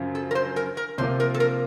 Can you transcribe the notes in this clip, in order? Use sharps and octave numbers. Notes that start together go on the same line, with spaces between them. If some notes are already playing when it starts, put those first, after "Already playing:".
Already playing: F#2 C#3 F3
A4
A#4
C5
A#4
A#4
C3 F3 A#3 F4 C5
A#4
A4
A#4